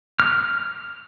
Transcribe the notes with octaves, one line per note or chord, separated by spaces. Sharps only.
F6